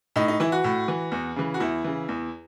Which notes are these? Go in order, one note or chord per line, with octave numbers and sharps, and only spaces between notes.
A2 D#4
D#4
E3 E4
F#4
A2
E3
E2
C#3 E3
F#4
E2 E4
C#3 E3
E2